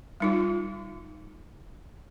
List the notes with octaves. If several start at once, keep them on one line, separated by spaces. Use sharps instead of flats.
G3 D#4 F4